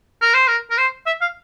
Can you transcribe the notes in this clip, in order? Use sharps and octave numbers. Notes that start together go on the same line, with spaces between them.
A#4
C5
A#4
A#4
C5
E5
F5